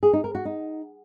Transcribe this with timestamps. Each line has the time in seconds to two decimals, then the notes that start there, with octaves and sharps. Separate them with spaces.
0.03 G#4
0.13 D#4
0.24 A#4
0.35 F#4
0.45 D#4